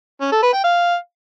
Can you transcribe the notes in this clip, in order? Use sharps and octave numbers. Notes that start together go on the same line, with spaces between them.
C#4
A4
B4
G5
F5